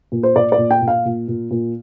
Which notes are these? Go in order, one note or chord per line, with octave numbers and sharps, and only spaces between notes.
A#2
C5
A#2 D5
D5
A#2
G5
A#2
F5
A#2
A#2
A#2